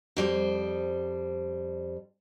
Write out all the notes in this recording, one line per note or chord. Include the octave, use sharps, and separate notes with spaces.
F2 G3 C5